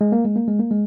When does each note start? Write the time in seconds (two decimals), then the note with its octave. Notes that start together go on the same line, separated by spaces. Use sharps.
0.01 G#3
0.12 A#3
0.25 G#3
0.36 A#3
0.48 G#3
0.59 A#3
0.71 G#3